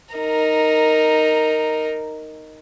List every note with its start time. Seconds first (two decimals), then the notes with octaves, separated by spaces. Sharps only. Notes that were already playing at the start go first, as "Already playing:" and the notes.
0.15 D#4 A#4